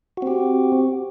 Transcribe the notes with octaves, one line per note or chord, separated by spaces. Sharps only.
C4 F#4 G4